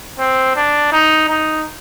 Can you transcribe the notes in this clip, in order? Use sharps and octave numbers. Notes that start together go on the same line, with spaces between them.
C4
D4
D#4
D#4